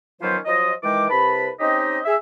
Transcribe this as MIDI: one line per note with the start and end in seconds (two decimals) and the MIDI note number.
0.21 0.37 51
0.21 0.37 53
0.21 0.37 54
0.21 0.37 59
0.21 0.37 61
0.21 0.37 72
0.46 0.73 53
0.46 0.73 54
0.46 0.73 65
0.46 0.73 75
0.83 1.07 51
0.83 1.07 52
0.83 1.07 56
0.83 1.07 79
0.83 1.07 86
1.10 1.49 36
1.10 1.49 48
1.10 1.49 71
1.10 1.49 81
1.10 1.49 83
1.60 1.98 60
1.60 1.98 61
1.60 1.98 63
1.60 1.98 67
1.60 1.98 75
2.04 2.15 68
2.04 2.15 76